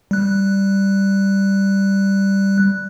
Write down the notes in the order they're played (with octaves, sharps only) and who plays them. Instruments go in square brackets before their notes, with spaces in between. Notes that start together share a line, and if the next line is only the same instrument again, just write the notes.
[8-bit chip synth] G3 F#6